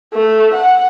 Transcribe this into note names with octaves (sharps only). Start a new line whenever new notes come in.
A3
F#5